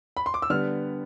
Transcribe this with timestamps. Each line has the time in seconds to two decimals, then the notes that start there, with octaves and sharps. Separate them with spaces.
0.17 B5
0.26 C6
0.34 D6
0.42 E6
0.50 D3 G3 B3 F6